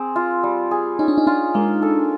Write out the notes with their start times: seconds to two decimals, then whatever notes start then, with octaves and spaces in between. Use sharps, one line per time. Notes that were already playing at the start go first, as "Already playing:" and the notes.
Already playing: C4 G#4
0.16 F4
0.43 G3
0.71 G#4
0.99 C#4 D#4
1.08 D4
1.18 D#4
1.27 D4 F4
1.54 G#3 A#3
1.82 A4